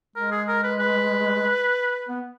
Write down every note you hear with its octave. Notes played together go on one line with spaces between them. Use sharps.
G#3 A#4
G#4
A#4
B4
B4
B3